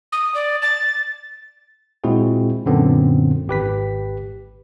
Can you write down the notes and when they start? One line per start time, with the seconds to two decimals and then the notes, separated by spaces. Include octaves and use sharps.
0.12 D#6
0.35 D5
0.62 A6
2.04 A#2 G#3 C4 E4 F#4 G#4
2.66 F#2 A#2 D3 B3 C4
3.48 G#1 G4 B4 B6